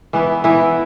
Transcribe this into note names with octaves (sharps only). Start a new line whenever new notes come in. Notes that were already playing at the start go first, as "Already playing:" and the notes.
E3 B3 E4
E3 B3 E4